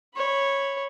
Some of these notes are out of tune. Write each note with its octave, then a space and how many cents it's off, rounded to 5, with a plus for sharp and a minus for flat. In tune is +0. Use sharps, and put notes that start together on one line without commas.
C#5 -5 B5 +0